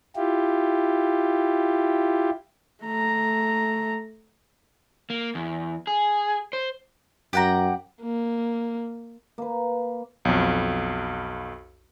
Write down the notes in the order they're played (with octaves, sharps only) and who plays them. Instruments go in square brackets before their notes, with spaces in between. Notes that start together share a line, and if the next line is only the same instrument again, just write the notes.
[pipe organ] E4 F4 G4
[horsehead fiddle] A3 A#5
[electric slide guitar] A#3
E2
G#4
C5
[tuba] F#2 [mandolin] G4 F#5 A#5
[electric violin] A#3
[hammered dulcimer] A#3 B4
[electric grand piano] B1 F2